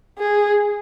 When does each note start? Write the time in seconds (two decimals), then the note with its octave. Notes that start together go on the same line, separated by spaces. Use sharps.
0.19 G#4